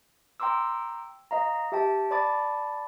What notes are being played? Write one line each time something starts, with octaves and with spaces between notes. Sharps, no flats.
G5 A#5 C6 D6 E6
D#5 F5 A#5
G4 E5 G5 A5
D5 A5 B5 D6 A6